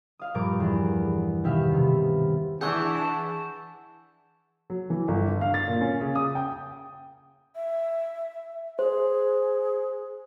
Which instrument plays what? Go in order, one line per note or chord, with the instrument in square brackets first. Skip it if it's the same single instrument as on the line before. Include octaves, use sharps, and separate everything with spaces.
[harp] F5 D#6
G2 A#2 F3 F4 A#4 D6
E2
B2 D#3 G4 E5 F5
C3 B3
[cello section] E3 [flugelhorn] D4 [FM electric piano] G#4 F#5 G#5 [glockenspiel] C#6 E6 G6
[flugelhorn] A5 [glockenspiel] E7
[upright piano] F#3
E3
G1
D3
F5
A6
A#2
C#4
C#3
D#6
G5
[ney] E5
[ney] G#4 [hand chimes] C5